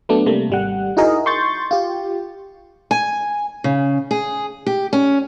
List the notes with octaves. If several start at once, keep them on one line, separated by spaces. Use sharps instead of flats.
F#3 A3 B3 D4
C3 G3 A3 A#3
G#1 G3 F#5
D#4 E4 F#4 G#4 A#4 D#5
C6 C#6 G6 A6
F4 G4
G#5
C#3
G#4
G4
C#4